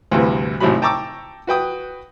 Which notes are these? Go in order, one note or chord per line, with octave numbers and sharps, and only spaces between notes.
D2 G2 C3 E3
G#1 A2 C3 F#3 B5
G5 A5 A#5 C#6 D6 E6
F#4 B4 G5 D#6